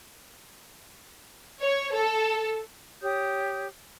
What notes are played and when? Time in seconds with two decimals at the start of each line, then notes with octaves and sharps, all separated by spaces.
1.60 C#5
1.95 A4
3.02 G4 C#5 D#6 G6